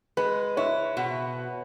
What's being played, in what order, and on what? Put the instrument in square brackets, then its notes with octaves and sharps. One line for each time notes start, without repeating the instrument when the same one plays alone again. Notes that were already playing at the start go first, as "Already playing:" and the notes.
[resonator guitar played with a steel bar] G#3 [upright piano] B4
[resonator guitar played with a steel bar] E4 [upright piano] C#5
[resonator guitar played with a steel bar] B2 [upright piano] F#5